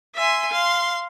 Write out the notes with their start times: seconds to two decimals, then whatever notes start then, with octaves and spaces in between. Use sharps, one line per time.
0.17 E5 G#5 C6
0.51 F5 C6